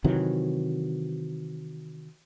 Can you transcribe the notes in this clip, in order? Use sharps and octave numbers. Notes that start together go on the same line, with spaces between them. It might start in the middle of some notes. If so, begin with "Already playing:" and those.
C3 D#3 E3 F#3